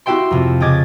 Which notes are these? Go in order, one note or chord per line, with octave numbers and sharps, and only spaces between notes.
E4 F#4 G4 E5 G5 C6
F2 C3
C#3 G4 D#5 D6 G#6 A6